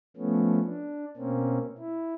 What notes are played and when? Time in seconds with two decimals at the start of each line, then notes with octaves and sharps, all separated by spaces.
0.17 F3 A3 B3 C#4
0.64 D4
1.17 B2 A#3 C4 C#4
1.78 E4